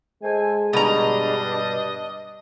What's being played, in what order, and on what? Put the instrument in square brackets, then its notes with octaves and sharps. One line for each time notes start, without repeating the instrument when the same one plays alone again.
[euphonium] G#3 [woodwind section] A4 C5 G#5
[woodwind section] G2 G3 D4 [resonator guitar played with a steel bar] B2 A#5 [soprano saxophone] D#5